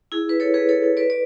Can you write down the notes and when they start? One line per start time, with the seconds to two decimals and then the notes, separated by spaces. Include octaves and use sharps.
0.12 E4 G#4
0.29 B4
0.40 A4 C#5
0.54 G#4 B4
0.69 A4 C#5
0.82 A4 C#5
0.97 B4 D5
1.10 D5